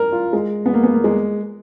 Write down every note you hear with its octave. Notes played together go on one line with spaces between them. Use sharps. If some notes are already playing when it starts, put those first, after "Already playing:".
Already playing: A#4
F4
G#3
B3
A#3
B3
A#3
G#3